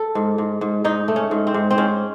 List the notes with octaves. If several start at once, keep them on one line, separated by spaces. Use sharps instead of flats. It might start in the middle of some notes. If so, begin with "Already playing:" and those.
Already playing: A4
G#2
G#2
G#2
G#2 D#4
A3
C#4
G#2
C4
G#2
C4
G#2 C#4